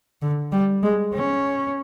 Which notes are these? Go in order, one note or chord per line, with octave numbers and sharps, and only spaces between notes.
D3
G3
G#3
C#4